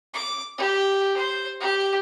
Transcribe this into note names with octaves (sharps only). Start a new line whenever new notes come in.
D6
G4
C5
G4